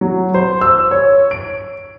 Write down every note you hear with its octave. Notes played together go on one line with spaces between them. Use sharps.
F#3
C5
E6
C#5
D7